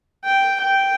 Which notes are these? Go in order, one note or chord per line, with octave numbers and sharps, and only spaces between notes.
G5
G5